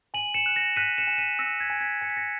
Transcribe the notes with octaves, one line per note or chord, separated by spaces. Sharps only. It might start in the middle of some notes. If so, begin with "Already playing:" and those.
G#5 D#7 F#7
C#7 E7
F#6
A#6 C#7
F#6 B6 D#7
C#7 E7
G#5
B6 D#7
E6 A#6 C#7
G#6 B6
G#5
G#6 B6
G#5 C#7
B6
A#6 C#7